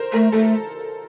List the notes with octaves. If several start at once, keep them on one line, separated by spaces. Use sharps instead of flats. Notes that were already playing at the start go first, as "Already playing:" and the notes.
Already playing: A#4 C5
A3 A#4
A3 A4